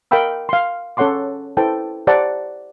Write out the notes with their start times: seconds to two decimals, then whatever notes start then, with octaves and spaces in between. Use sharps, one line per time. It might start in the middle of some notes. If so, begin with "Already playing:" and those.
0.11 A#4 D#5 F5 G5 B5 E6
0.49 F5 C6
0.97 C#4 A4 C#5 F#5 C6 D6
1.57 E4 A4 B4 C5 G5 A5
2.07 G4 C5 D5 F#5 A5 A#5